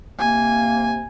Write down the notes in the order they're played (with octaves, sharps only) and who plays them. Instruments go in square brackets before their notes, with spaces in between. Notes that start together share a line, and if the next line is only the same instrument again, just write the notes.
[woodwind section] C3 A#3 [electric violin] G#5